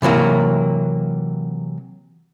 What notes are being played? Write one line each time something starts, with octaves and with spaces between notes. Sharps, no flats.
C3 E3 F#3 A#3